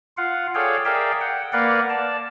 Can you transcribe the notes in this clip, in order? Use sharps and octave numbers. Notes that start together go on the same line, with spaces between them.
F4 F5 F#5
G#4 A4 C#5 D5 F5 G5
G#4 A#4 D5 E5 F5 G5
F#5 G5
A#3 A#4 B4 D5 F5 F#5
D5 A5